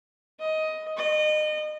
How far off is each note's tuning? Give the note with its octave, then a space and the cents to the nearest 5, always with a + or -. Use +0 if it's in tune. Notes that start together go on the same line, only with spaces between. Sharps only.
D#5 +10
D#5 -30